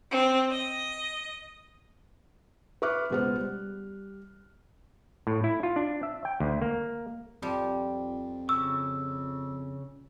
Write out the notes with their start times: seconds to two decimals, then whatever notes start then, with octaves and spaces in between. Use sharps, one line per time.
0.10 C4
0.51 D#5
2.82 B4 E5 C#6 D6 F6 F#6
3.10 C#2 B2 G#3 B3 C5 F6
3.37 G3
5.27 A2
5.44 E4
5.63 F4
5.76 D4
6.03 E5
6.25 G5
6.40 D2
6.62 A#3
7.42 F2 F3 G3
8.49 C#3 C#6 E6